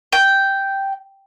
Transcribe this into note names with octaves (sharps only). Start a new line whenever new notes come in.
G5